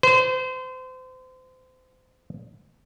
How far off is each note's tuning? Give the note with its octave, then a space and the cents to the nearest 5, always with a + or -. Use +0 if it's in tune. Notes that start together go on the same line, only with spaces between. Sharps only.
C5 -30